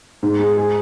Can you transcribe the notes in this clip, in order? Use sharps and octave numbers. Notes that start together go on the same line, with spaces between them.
G#2
G#3
G#4